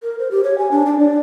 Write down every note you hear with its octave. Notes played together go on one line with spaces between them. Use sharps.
A#4
C5
G4
C#5
G#5
D4
D4
D5